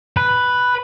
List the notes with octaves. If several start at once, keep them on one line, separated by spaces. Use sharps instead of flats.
B4